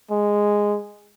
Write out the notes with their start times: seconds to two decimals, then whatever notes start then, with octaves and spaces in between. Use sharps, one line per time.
0.11 G#3